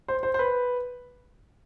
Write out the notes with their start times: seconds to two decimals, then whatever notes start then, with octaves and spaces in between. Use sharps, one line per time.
0.08 C5
0.23 C5
0.34 C5
0.39 B4